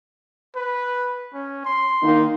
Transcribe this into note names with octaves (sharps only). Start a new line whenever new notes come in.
B4
C#4
C6
D#3 A#3 D#4